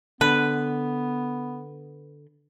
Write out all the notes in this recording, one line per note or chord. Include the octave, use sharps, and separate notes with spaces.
D3 B3 B4